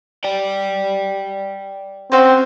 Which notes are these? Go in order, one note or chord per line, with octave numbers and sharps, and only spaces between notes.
D5 G5
C4 C#4 F#4 C5